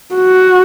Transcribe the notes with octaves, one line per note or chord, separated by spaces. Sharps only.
F#4